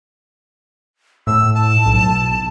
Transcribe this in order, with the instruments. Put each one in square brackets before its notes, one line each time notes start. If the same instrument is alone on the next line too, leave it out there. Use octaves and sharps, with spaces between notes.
[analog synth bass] A2 [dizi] E6
[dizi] A5
[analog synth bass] B1